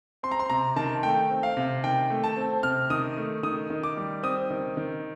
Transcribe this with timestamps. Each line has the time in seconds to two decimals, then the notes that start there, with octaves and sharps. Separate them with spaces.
0.23 C4 C6
0.31 A#5
0.39 C6
0.50 C3 A#5
0.76 D#3 A5
1.03 A3 G5
1.30 C4
1.43 F5
1.57 C3
1.84 D#3 G5
2.10 A3
2.24 A5
2.37 C4
2.63 C3 F6
2.90 D#3 D#6
3.17 A3
3.43 D#3 D#6
3.70 D#3
3.83 D6
3.97 G3
4.23 C4 D#6
4.50 D#3
4.77 D#3